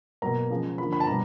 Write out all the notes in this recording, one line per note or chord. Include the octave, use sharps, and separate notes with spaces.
B2 F#3 A#3 A#5
C#3 F3 G#3
D3 F3 A#3 B5
B5
A5
B2 G3 A#5